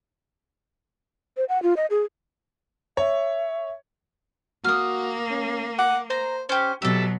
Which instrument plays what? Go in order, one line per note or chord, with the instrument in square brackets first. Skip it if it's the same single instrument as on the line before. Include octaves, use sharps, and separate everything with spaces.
[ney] C5
F#5
F4
D#5
G#4
[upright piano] C#5 [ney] E5
[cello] A#3 [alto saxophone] F#4 [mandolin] D#6 F6
[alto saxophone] C#4
[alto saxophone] F#5 [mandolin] D6
[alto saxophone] C5 [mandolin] A#5
[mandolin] C#4 G4 [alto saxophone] C5
[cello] B2 F#3 [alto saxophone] G4 [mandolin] A4 E5